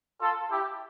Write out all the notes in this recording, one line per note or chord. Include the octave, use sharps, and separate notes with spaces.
F4 A4
E4 G4